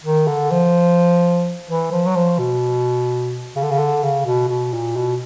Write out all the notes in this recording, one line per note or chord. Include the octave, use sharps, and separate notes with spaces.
D#3
D3
F3
E3
F3
F#3
F3
B2
C#3
D3
C#3
D3
C#3
B2
B2
A#2
B2